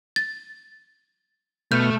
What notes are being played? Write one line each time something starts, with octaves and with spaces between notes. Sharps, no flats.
A6
B2 A3 F6 G6